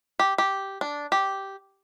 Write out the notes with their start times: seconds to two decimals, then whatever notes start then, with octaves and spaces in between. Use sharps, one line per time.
0.19 G4
0.38 G4
0.81 D4
1.12 G4